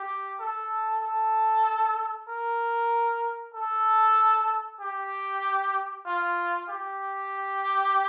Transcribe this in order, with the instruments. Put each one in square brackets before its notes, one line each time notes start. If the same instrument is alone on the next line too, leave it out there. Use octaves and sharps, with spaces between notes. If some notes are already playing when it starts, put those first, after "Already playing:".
Already playing: [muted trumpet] G4
A4
A4
A#4
A4
G4
F4
G4